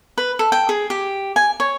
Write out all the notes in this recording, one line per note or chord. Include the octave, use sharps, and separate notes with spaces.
B4
A4
G5
G#4
G4
G#5
C#5